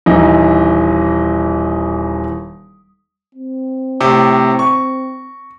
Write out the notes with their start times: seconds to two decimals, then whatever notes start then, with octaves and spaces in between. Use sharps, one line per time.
0.06 D#1 E3 D#4
3.35 C4
4.01 A2 C3
4.59 C#6